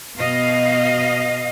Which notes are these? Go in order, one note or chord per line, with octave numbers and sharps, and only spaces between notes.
B2 D#5 F5